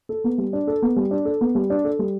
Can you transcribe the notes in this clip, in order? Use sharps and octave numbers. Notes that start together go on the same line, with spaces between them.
A4
B3
G3
D4
A4
B3
G3
D4
A4
B3
G3
D4
A4
G3